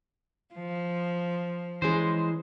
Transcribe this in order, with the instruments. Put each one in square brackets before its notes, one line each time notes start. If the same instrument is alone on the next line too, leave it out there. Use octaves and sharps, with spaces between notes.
[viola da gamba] F3
[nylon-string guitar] E3 C#4 G#4 [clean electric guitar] G#3 C5